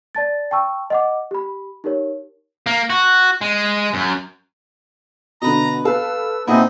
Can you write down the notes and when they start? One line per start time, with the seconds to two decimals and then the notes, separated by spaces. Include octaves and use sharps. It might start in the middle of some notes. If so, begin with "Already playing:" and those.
0.15 D5 A5 A6
0.51 G5 A5 C#6 E6
0.90 D#5 F#5 D6
1.31 G4 B5
1.84 D#4 G4 A#4 C#5
2.66 A#3
2.90 F#4
3.41 G#3
3.94 F#2
5.42 B2 D3 B4 D#5 A#5
5.85 A4 B4 F5 E6
6.47 A#2 C4 D#4 E4 F#4 G#4